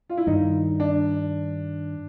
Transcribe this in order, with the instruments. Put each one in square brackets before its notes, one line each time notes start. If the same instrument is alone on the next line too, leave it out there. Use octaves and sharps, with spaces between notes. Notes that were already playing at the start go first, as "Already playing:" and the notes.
[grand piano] F4
E4
[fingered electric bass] G2 D#3 G3 [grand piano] D#4
[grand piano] D4